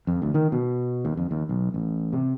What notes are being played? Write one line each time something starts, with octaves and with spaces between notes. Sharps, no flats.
F2
D2
D#3
B2
D#2
F2
D#2
B1
A1
C3